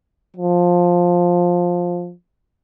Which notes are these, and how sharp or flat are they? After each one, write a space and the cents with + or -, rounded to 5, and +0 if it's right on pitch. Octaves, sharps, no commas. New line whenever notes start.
F3 +10